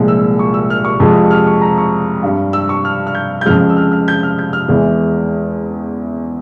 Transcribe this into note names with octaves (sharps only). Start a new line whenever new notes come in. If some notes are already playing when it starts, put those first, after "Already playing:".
Already playing: C2 A#2 F3 G#3
E6
C#6
E6
F6
C#6
F2 C3 F3 G#3
F6
C#6
A#5
C#6
G2 G3
E6
C#6
F6
F6
G6
G6
F2 C#3 F3 G#3 F6
E6
F6
F6
G6
F6
G6
F6
E2 E3 G#3